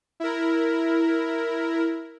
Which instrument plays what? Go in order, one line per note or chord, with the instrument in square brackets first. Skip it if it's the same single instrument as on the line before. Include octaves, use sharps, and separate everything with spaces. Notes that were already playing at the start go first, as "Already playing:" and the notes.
[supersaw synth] E4 A#4